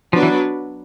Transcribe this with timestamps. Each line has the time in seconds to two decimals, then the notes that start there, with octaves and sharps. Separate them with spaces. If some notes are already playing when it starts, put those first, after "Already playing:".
0.13 F3 F#3 B3 D4 F#4 B4
0.23 E3